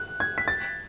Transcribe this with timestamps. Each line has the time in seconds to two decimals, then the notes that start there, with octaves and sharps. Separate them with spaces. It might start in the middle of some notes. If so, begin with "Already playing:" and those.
Already playing: F#6
0.20 G#6
0.38 B6
0.48 A6